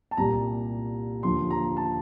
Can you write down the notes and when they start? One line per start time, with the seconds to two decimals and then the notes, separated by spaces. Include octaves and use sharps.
0.11 A5
0.17 C2 A#2 G3 A#5
1.23 D#2 D3 F3 C6
1.50 A#5
1.77 A5